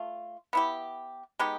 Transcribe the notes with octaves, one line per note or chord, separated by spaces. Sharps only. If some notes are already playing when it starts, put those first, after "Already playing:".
Already playing: A3 F4
B3 E4 G4
G#3 B3 D#4 G4